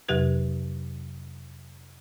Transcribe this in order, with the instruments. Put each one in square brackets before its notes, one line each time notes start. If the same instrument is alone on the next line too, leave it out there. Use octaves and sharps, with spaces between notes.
[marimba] F2 C3 F#3 G4 B4 G#6